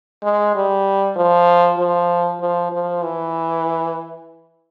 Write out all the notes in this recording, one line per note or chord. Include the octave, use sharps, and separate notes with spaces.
G#3
G3
F3
F3
F3
F3
E3